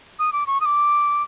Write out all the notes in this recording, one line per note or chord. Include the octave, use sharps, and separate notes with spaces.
D#6
D6
C#6
D#6
D6